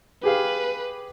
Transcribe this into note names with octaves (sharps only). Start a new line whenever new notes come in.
G4 G#4 B4 F5